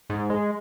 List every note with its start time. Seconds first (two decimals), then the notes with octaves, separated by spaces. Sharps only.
0.10 G#2
0.30 G#3